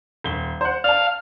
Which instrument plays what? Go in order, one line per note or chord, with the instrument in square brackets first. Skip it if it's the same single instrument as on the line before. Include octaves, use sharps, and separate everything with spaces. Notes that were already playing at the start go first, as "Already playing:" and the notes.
[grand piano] D#1 G7
C5 F#5
[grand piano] D5 A5 [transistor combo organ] F5